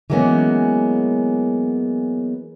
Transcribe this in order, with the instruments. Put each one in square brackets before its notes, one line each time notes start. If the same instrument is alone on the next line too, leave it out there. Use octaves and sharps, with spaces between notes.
[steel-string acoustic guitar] E3 F#3 G#3 A#3 B3 C#4